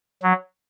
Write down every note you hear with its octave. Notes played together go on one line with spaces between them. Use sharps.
F#3